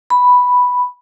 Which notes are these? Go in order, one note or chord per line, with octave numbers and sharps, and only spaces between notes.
B5